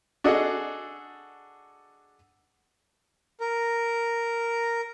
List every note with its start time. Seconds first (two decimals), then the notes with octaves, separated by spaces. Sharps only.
0.24 D4 F#4 G#4 A4 D#5 F#5
3.40 A#4